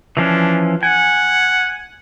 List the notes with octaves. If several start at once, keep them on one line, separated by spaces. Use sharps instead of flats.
E3 F3 C#4 D4
F#5 G#5